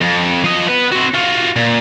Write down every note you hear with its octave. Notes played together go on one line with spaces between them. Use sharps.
F2
F3 D#5
B3 B4
C4 F#4
F4 F#4
A#2